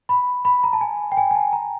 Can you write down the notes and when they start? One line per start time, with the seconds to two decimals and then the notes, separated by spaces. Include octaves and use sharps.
0.09 B5
0.45 B5
0.64 A#5
0.73 A5
0.81 G#5
1.12 G5
1.17 G#5
1.31 G#5
1.35 A5
1.53 A#5